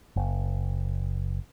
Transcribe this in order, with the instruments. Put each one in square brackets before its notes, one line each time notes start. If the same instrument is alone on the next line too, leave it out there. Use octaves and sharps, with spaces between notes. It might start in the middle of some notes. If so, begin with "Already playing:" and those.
[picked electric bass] F#1